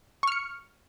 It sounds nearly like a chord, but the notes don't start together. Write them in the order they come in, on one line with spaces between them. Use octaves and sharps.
C#6 F6 C#7